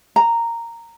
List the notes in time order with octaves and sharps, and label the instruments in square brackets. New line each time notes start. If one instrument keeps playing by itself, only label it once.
[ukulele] A#5